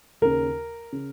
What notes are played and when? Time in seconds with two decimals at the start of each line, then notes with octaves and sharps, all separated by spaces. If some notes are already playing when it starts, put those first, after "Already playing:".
0.22 D#2 C#3 A#4
0.92 C#3